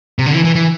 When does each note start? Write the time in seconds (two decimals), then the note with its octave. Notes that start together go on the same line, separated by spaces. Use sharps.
0.19 C3
0.26 D3
0.33 E3
0.45 E3
0.55 E3